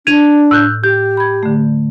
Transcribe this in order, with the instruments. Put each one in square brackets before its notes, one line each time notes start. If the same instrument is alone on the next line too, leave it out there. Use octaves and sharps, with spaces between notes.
[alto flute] D4 [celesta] G#6 D#7 F7
[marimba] A2 [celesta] E6 F#6 G6
[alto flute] G4 [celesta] G6
[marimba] B5 G#6
D3 A3